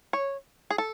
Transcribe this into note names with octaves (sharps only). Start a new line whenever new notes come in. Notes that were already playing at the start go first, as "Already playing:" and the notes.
C#5
G#4
A4